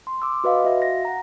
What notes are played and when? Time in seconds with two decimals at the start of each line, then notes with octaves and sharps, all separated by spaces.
0.07 C6
0.22 C6 D6 E6
0.44 F#4 B4 D#5 F5
0.65 F#4 E5 F5
0.82 A#6
1.05 F#5 A#5